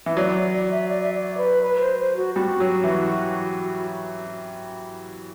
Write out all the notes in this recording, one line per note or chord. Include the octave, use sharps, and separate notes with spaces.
E3
F#3 D5
D5
E5
D5
E5
D5
B4
B4
C5
C5
F#4
G3 F#4
F#3
E3